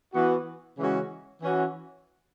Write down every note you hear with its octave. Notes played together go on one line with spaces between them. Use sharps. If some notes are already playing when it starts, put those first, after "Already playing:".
E3 B3 F#4
C#3 E3 G#3 C#4 F#4
E3 C#4 F#4